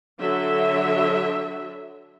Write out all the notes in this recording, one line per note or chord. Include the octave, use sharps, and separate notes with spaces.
D3 F#3 E5